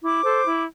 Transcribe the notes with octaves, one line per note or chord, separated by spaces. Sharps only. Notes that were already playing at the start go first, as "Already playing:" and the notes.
E4 D6
A4 C5
E4